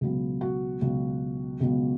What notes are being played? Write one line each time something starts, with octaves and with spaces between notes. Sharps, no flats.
C#2 B2 F#3 B3
F#4
C#2 B2 F#3 B3
C#2 B2 F#3 B3